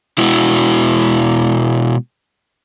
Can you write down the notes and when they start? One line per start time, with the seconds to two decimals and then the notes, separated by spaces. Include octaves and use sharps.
0.18 B2 G#3 E4 F#4